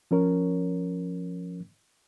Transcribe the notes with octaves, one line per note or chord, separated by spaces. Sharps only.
F3 C#4 A#4 C#5